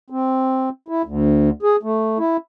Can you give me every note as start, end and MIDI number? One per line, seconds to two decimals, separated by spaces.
0.10 0.69 60
0.88 1.02 64
1.05 1.50 38
1.63 1.76 68
1.83 2.18 57
2.18 2.37 64